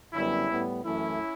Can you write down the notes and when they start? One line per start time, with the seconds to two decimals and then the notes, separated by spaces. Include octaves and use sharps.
0.13 F#2 D3 G3 B3 C#4 E4
0.50 A2 G3 B3
0.84 F#2 E3 A3 C#4 E4